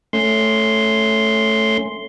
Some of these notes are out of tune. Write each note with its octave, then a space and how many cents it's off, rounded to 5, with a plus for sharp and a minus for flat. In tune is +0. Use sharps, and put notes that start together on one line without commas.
A3 +0 C#4 +0 C6 +0